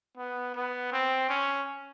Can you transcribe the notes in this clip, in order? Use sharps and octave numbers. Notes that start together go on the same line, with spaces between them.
B3
B3
C4
C#4